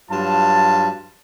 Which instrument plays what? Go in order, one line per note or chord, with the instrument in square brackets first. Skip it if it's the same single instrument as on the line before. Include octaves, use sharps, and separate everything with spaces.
[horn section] G2 F#3 F4 A5